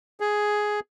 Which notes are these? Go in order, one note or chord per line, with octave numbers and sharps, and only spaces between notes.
G#4